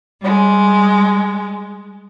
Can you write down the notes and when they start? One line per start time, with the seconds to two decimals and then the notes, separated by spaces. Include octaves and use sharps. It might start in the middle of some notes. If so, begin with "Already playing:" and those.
0.21 G3 G#3